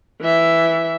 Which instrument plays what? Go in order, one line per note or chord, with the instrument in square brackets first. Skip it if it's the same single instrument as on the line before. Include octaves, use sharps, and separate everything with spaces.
[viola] E3 E5